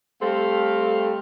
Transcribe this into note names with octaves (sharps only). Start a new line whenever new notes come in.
G3 A3 C4 A4 F5